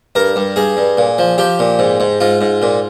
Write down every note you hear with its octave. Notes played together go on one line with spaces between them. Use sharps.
G2 A#4
G2
G2 G#4
G2
A#2
F3
F3 G4
A#2
G#2
G#2
G#2 F4
G#2
A#2